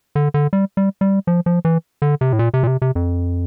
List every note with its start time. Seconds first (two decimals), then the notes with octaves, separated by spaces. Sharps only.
0.16 D3
0.34 D3
0.53 G3
0.77 G3
1.01 G3
1.27 F3
1.46 F3
1.65 E3
2.02 D3
2.21 C3
2.33 A2
2.39 A#2
2.54 C3
2.63 A#2
2.67 C3
2.82 C3
2.95 F2